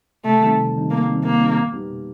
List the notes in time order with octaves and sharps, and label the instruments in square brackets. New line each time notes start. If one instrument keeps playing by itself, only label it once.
[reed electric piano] C3 [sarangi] A3
[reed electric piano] D#3 G3 C4 D#4
C3
D#3 G3 C4 D#4
[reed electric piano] C3 [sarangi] A#3
[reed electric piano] D#3 G3 C4 D#4
[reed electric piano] C3 [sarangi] A#3
[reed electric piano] D#3 G3 C4 D#4
B2
G3 B3 D#4 G4
B2